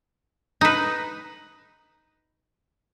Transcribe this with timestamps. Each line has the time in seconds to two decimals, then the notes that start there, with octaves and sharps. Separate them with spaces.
0.61 D#4 B4